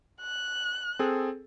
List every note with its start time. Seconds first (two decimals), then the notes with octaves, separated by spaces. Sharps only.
0.21 F#6
0.99 C4 G#4 A4